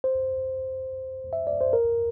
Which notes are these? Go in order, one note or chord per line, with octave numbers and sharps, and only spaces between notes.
C5
E5
D5
C5
A#4